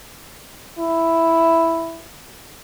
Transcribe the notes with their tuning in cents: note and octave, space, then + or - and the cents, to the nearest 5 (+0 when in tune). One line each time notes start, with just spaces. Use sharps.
E4 +0